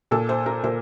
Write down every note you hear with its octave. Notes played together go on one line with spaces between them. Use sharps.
A#2 A4
C5
A#4
A#2 C5